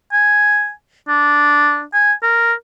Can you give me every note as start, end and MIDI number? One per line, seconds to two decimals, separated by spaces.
0.12 0.70 80
1.08 1.83 62
1.93 2.13 80
2.23 2.53 70